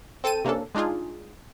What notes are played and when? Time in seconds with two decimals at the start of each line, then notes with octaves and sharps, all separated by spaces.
0.24 C4 A4 G5 A5 D#7
0.44 C3 A#3 C#4 D4 A4
0.75 G#3 D4 D#4 F4 G#4